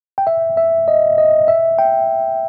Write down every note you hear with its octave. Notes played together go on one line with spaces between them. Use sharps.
G5
E5
E5
D#5
D#5
E5
G5